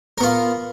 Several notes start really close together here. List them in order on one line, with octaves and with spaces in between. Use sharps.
A#4 B3 F4